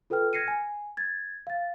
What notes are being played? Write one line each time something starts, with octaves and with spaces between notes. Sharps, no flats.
F4 A4 B4 G5 F6
F6 G#6 A#6 C7 C#7 D#7
G#5
G#6 A6
F5 A6